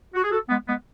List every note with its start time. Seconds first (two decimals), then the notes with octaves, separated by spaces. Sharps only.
0.14 F#4
0.23 G#4
0.32 F#4 A4
0.49 G#3 B3
0.68 G#3 B3